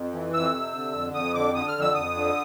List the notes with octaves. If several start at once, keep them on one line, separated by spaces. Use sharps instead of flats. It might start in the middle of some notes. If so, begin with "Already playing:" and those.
Already playing: F2
E3
F2 E6
C3
D3
F2
F2 D#6
D3 D6
D3 D#6
F6
F2
E6
F2 D#6
D3